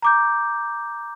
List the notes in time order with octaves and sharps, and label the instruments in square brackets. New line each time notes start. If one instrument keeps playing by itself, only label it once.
[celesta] A#5 D6 G6